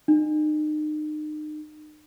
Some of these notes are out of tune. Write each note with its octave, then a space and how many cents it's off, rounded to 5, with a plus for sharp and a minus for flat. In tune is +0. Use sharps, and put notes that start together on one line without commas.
D#4 -35